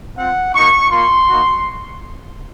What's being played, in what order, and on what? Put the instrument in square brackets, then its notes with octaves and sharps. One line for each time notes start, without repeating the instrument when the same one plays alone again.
[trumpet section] C4 F4 F#5
A#3 D#4 F#4 C#6
A#3 F4 C6
A#3 D#4 F#4